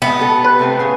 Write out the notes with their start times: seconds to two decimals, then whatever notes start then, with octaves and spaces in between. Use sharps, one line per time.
0.02 G#3 B3 E5
0.19 G4 A4
0.45 B4
0.59 C3 A3 C4
0.79 A2 C#3 G#4